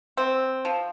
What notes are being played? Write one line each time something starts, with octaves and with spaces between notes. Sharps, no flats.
C4
F3